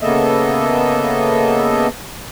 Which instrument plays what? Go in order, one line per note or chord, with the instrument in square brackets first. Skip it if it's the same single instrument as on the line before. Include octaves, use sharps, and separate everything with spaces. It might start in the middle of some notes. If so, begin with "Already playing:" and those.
[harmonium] C#3 A#3 B3 A4 D#5 E5